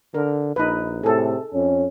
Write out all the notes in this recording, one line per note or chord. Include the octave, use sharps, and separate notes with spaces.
D3 A#4
A#1 D#4 B4
A2 C3 G#4 A4
F2 C#4